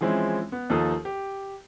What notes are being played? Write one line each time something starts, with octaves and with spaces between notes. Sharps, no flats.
E3 F3 G#3 C4 C#4 E4
B3
D#2 F3 D#4 A4 D#6
G4